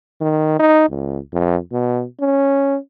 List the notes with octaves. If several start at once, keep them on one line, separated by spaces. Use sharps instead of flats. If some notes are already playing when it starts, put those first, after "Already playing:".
D#3
D#4
C#2
F2
B2
C#4